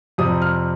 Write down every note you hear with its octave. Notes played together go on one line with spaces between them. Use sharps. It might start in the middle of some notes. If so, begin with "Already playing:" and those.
F2 C3 G3 D#6
F6